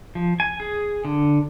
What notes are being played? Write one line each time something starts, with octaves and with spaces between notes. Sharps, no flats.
F3
G#5
G#4
D3